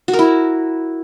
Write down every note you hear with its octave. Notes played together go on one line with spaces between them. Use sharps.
F#4
A#4
E4